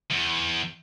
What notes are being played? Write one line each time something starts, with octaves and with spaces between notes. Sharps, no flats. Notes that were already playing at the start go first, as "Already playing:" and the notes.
E2